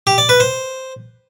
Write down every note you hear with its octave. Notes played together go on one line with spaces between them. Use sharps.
G4
D5
B4
C5